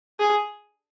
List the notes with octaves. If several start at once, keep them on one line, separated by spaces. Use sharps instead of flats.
G#4